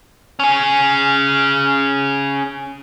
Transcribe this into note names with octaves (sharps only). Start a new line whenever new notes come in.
C#4 G#4